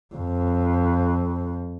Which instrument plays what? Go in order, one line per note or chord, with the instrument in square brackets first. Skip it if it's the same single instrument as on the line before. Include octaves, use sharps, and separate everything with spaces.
[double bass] F2